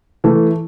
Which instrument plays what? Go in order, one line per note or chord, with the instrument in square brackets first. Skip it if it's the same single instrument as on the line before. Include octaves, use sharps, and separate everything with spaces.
[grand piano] E3 A3